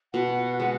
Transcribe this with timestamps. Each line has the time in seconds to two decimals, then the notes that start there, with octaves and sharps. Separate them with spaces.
0.14 B2 F#5
0.60 G#3 B3